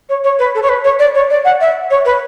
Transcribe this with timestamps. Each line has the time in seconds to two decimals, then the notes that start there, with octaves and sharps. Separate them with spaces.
0.09 C#5
0.24 C#5
0.39 B4
0.55 A4
0.63 C#5
0.69 B4
0.84 C#5
0.99 D5
1.15 C#5
1.30 D5
1.45 F#5
1.61 E5
1.90 C#5
2.05 B4